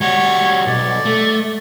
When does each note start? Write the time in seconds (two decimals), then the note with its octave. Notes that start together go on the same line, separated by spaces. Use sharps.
0.01 G3 F#4 C#5
0.67 B1 D5
1.05 A3